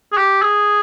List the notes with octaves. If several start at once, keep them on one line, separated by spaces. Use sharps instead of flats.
G#4
G4
G#4